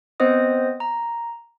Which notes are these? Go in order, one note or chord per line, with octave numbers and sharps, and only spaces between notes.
B3 C4 C5 D#5 D#6
A#5